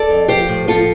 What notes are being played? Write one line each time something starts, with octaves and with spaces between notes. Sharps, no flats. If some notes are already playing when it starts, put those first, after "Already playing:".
Already playing: A4 D5
F2
F3 G4 C5
A2
F3 F4 A4